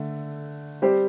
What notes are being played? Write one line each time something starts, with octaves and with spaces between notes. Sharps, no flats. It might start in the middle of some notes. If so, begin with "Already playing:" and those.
Already playing: D3 A3
G3 C4 G4 C5